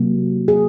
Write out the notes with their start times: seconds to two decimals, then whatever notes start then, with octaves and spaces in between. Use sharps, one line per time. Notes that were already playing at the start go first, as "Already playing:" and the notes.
Already playing: C3 F#3 A#3
0.48 G#4